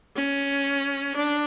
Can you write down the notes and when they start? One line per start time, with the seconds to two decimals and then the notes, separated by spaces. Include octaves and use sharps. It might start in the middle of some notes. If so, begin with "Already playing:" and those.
0.16 C#4
1.16 D4